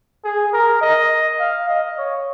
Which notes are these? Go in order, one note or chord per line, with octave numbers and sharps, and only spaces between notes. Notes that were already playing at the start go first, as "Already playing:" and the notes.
G#4
A#4
D#5
F5
D#5
C#5